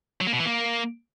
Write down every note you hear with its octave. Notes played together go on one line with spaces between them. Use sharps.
F#3
A#3
B2
E3
A#3